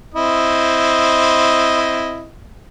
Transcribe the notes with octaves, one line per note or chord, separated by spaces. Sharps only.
C4 E4 D#5